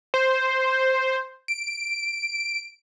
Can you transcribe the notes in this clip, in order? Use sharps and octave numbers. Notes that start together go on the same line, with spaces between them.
C5
D7